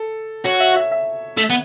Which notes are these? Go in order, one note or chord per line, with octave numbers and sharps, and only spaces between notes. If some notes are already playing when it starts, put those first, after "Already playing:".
Already playing: A4
F#4 C#5
E5
E5
E5
A3
B3